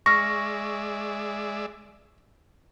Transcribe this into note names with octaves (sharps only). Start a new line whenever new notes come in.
G#3 D5 E5 C#6 F6 A#6